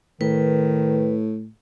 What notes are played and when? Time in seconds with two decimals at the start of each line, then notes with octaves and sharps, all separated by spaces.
0.21 A2 D#3 B4